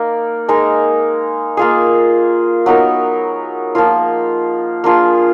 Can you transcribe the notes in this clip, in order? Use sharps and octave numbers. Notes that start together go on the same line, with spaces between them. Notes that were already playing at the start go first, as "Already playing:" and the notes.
Already playing: A#3 D#4 A#4 D5
G#3 D#4 A#4
A#3 F4 G#4
F#3 B3 D#4 A#4
F3 A#3 F4
A#3 D4 F4 G#4